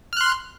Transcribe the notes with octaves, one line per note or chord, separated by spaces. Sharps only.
C6 F6 F#6